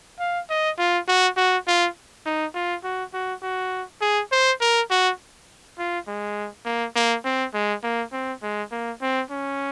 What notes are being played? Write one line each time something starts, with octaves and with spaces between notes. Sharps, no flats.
F5
D#5
F4
F#4
F#4
F4
D#4
F4
F#4
F#4
F#4
G#4
C5
A#4
F#4
F4
G#3
A#3
A#3
C4
G#3
A#3
C4
G#3
A#3
C4
C#4